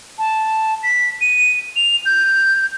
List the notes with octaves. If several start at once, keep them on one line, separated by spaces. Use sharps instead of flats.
A5
B6
D#7
F7
G6